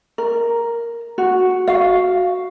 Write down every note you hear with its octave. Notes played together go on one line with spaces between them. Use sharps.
A#4
F#4
F#4 F5